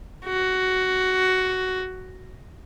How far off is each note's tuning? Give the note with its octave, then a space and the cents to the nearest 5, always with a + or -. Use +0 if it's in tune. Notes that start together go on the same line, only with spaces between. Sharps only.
F#4 +10